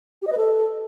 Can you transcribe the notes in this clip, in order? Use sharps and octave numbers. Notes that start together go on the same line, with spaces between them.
G4
D#5
B4
A4